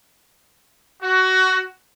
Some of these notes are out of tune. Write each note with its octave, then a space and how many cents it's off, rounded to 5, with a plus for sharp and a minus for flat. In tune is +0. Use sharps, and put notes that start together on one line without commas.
F#4 +20